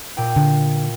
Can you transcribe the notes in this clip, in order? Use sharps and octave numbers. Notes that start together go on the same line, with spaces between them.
A#2 G5 D#7
D3